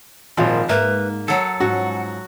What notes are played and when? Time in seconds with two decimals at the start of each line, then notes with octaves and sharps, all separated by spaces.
0.37 G#1 A#2 D#3 F3 F#3 F4
0.69 G#2 A#3 B4 E5
1.28 F#3 A4 F#5
1.60 G#2 F3 C#4 F#4